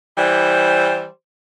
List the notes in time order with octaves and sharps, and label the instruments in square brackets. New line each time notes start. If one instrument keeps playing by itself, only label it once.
[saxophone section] E3 G3 C5